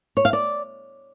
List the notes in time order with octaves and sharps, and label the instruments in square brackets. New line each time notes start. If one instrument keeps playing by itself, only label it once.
[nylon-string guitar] C#5
F5
D5